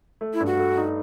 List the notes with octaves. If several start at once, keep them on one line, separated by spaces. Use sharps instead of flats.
A3
E4
G2
F#4
A3
D#4